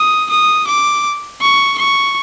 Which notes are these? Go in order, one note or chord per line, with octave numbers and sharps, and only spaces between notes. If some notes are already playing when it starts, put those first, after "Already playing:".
Already playing: D#6
D#6
D6
C#6
C#6